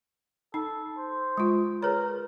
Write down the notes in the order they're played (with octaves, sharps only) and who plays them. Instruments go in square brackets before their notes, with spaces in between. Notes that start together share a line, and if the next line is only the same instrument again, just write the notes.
[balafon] D#4 [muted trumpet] A4
[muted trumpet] C5
[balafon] G#3 F4
[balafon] G#4 B4 C#5 [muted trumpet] A#4